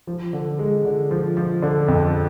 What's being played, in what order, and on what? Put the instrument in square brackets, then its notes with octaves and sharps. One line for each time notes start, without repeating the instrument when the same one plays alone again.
[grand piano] F3
D3
G#3
D3
F3
F3
D3
F2